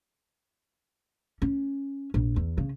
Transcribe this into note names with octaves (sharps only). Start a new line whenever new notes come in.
C#4
A#1
E2
C#3